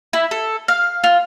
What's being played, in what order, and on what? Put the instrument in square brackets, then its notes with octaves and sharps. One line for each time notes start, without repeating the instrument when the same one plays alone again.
[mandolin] E4
A4
F5
F4